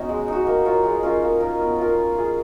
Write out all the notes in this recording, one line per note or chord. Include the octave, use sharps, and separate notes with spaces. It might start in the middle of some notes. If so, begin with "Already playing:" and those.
Already playing: B3 C#4 D#4 F#4 D#5
G#3
D#4 F#4
A#3
F4 A#4 C#5
G#3
C#4 F4 A#4
A#3
D#4 A#4 D#5
B3
F4 A#4
C#4
F4 G#4